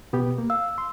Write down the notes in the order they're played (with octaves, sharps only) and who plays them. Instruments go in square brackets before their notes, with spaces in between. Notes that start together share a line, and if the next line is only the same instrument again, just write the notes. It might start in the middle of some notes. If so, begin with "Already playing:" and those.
[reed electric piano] B2 B3 G4
A#3
[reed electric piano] F5 [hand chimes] E6
[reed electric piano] C6